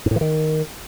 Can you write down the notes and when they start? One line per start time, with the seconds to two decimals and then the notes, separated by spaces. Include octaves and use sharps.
0.06 G#2
0.11 A2
0.16 E3
0.21 D#3